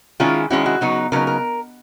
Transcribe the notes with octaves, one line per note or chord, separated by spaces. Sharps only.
D#3 G#3 C#4 E4 F4
D#3 G#3 C#4 E4 F#4
F#4
C#3 F#3 B3 D#4
C#3 F#3 B3 D#4 A#4
A#4